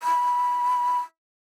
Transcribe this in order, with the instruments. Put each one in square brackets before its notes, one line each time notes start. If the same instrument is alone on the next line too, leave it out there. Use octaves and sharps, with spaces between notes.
[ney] B5